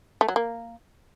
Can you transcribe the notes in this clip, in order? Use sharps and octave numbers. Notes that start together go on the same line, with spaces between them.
A3
F#3
A#3